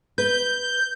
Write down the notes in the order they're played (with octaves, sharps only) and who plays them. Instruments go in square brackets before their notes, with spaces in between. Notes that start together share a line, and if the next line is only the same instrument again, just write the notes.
[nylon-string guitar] B4 [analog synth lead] G6